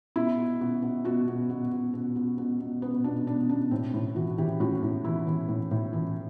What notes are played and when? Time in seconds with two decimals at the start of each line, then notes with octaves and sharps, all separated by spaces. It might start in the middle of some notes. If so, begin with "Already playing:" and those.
0.16 B2 E4
0.38 B2
0.61 B2
0.82 B2
1.05 B2 F#4
1.28 B2
1.50 B2
1.71 B2
1.93 B2
2.16 B2
2.38 B2
2.60 B2
2.82 B2 B3
3.04 B2 D4
3.27 B2 D4
3.49 B2 D4
3.71 A2 C4
3.94 A2
4.15 E3 F#4
4.38 E3 G4
4.60 A2 F#4
4.83 A2
5.04 E3 E4
5.27 E3
5.49 A2
5.71 A2
5.93 E3